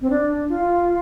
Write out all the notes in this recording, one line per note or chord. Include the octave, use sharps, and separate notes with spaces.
C4
D4
F4